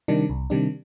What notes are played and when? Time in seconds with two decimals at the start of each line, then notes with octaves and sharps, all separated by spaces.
0.08 C3 D#3 G3 D4
0.30 C2
0.50 C3 D#3 G3 D4